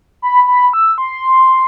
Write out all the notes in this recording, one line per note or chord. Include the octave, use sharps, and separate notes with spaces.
B5
B5
E6
C6